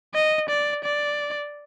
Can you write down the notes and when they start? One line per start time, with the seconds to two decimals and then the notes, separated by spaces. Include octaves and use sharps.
0.14 D#5
0.49 D5
0.84 D5